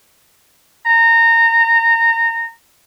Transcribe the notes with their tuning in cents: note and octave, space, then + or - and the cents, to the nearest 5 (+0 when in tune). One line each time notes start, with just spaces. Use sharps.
A#5 -20